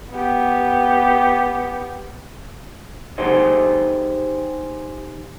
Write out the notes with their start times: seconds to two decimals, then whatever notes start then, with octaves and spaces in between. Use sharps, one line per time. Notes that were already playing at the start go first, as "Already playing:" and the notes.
0.12 B3 G4
3.18 D#4 G4 G#4 C5 D#5